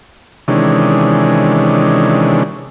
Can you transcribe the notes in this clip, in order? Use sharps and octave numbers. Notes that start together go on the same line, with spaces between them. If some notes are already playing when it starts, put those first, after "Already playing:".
C3 D#3 E3 G#3 C#4 D4